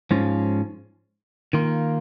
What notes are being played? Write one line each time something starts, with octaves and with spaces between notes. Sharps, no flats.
G#2 F3 C#4 F4
D#3 A#3 F4